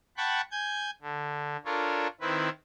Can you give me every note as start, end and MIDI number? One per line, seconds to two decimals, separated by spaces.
0.17 0.41 78
0.17 0.41 79
0.17 0.41 81
0.17 0.41 83
0.17 0.41 85
0.17 0.41 90
0.51 0.90 80
0.51 0.90 91
0.51 0.90 92
1.02 1.57 50
1.65 2.07 62
1.65 2.07 65
1.65 2.07 69
1.65 2.07 70
1.65 2.07 73
2.21 2.49 51
2.21 2.49 60
2.21 2.49 64
2.21 2.49 71